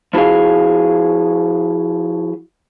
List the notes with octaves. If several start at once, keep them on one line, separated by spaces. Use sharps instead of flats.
F3 E4 F#4 G#4 F5